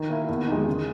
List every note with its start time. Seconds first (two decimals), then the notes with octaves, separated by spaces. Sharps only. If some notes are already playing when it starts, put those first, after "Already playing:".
Already playing: D#3
0.10 A#3 E4
0.29 E2
0.47 D#3 G#3
0.67 C#3